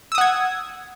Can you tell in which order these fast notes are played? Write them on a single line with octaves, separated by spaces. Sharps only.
E6 D#6 F#5 G#6